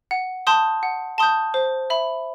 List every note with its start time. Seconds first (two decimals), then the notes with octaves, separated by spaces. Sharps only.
0.11 F#5
0.47 A5 C6 D#6 G6
0.83 F#5
1.18 A5 C6 D#6 G6
1.54 C5
1.90 E5 B5